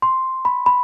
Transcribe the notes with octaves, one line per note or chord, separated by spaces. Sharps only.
C6
B5
B5